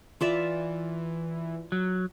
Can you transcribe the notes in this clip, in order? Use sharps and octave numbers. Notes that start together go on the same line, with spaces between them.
E3 F4 D5 E5
F#3